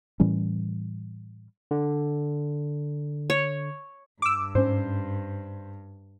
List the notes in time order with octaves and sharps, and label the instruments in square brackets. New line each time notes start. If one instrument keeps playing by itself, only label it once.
[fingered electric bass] A2 E3 G3 C#4
[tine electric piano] D3
[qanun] C#5
[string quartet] G2 [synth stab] D6 E6
[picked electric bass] G#2 C#4 [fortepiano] C5